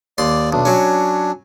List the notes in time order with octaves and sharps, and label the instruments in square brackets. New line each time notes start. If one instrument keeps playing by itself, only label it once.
[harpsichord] D#2 C6 [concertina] D5
[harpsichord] B1 [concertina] D4
[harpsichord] F#3 C#4